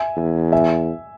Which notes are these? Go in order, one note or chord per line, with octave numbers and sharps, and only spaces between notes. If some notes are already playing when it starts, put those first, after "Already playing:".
Already playing: E5 G#5
E2
E5 G#5